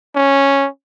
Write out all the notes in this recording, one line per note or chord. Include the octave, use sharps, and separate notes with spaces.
C#4